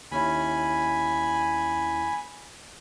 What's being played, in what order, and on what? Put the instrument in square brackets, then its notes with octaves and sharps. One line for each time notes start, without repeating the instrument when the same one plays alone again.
[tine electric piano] D#2 C#4 E4 [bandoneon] G#5 B5